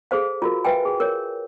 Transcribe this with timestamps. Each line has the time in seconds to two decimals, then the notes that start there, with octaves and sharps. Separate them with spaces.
0.11 G#4 A4 C5 F5
0.42 F4 F#4 A#4
0.64 B4 E5 F5 G5 G#5
0.85 G#4
1.00 A#4 C#5